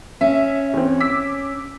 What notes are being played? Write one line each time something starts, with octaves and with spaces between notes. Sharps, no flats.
C#4 E5
E2 C4
D6 E6 B6